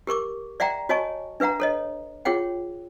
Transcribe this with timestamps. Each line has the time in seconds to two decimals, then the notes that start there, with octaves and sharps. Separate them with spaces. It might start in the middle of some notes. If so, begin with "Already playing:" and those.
0.07 G4 A#4 C#6 D6
0.60 D5 E5 F#5 G5 A#5
0.89 F#4 C#5 D#5 G#5 A5 C#6
1.40 D4 B4 E5 F#5 A#5
1.60 A4 C#5 D#5
2.25 F4 G#4 C#5 F#5 G5